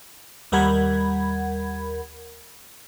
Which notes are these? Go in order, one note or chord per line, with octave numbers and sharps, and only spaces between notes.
D#2 G3 A#4 F#5 B5 G#6